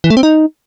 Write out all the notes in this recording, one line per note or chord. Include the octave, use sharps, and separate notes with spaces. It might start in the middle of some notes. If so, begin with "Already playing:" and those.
E3
A3
C4
D#4